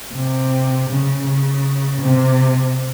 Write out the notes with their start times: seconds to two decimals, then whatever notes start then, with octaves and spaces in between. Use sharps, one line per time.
0.14 C3
0.90 C#3
1.27 C#3
2.01 C3